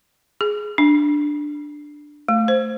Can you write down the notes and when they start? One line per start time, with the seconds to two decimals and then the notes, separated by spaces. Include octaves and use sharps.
0.41 G#4
0.78 D4
2.29 A3
2.48 C5